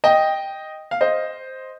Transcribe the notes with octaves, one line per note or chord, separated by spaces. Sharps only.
D#5 G5
F5
C5 D#5